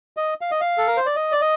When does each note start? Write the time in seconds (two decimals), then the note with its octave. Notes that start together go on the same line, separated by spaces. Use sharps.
0.17 D#5
0.41 F5
0.51 D#5
0.61 F5
0.78 A4
0.87 A#4
0.97 C5
1.06 D5
1.16 D#5
1.32 D5
1.41 D#5